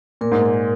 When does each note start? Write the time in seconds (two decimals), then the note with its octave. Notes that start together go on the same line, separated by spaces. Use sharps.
0.21 A#2 A#4
0.32 G#2
0.42 A#2